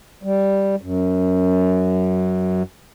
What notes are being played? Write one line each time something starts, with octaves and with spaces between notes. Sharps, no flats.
G3
F#2